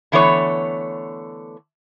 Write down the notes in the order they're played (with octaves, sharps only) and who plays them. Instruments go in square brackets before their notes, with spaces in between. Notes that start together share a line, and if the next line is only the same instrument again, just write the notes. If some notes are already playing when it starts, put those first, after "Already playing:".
[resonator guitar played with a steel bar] D3 E3 A3 B3 C#5